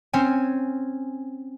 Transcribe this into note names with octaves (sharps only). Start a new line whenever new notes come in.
C4 C#4 G#5